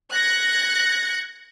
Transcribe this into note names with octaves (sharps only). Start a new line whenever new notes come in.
F#6 G#6 A#6 C#7